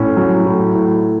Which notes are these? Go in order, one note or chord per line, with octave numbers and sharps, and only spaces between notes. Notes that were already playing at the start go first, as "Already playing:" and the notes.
Already playing: A2 C#4
F#3
A2
A2